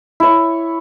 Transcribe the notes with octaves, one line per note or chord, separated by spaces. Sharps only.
E4 C#5